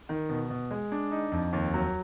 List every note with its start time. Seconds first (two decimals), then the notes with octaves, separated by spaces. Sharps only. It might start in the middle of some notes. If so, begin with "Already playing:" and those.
0.09 D#3
0.29 B2
0.50 B2
0.71 G#3
0.92 D4
1.11 D#4
1.32 F2
1.53 D#2
1.74 F#3